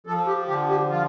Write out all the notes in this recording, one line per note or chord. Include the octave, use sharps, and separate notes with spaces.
F3 A4
G4
D3 G4
G4
F3 F4